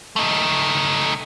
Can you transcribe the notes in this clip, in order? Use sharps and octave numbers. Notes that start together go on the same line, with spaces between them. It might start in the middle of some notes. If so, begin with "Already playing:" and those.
A3 D#4